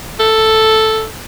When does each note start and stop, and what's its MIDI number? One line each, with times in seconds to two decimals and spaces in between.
0.20 1.06 69